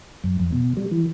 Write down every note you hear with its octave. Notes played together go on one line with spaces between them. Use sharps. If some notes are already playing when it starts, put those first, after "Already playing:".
F#2
F2
B2
G3
E3